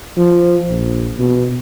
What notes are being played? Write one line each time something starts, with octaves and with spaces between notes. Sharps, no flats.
F3
A#1
B2